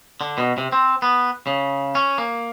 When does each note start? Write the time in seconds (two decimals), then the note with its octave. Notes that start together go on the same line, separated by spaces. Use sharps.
0.21 D3
0.38 B2
0.58 C3
0.72 C4
1.02 B3
1.47 C#3
1.95 C#4
2.18 A#3